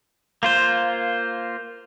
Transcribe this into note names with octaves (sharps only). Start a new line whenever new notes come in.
A#3 F4 C5